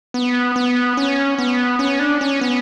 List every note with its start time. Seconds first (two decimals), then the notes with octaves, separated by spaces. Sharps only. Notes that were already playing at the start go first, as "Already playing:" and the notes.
0.14 B3
0.56 B3
0.97 C#4
1.39 B3
1.79 C#4
1.99 D4
2.21 C#4
2.41 B3